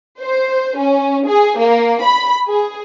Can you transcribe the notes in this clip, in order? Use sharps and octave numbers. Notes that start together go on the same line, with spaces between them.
C5
C#4
G#4
A#3
B5
G#4